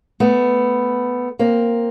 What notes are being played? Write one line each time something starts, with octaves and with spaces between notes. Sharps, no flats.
A3 B3
A#3 C4